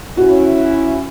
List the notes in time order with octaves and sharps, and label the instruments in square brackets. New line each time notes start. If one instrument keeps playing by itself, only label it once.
[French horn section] C#4 E4 [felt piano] F#4